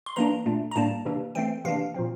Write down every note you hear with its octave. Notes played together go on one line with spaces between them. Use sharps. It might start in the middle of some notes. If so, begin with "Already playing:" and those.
C6
E3 A#3 D4 A#5
A#2 A3 D4
A#5
A2 G3 A#3 D4 A5
C3 E3 A#3 D4
E3 A3 C4 G5
C3 E3 A#3 D4 F5
A#2 F3 C4